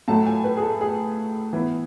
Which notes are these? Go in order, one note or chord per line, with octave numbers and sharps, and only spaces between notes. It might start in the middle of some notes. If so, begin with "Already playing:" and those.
A2 F#3 A3 A5
G#5
B4
G#4
A4
G#4
E3 B3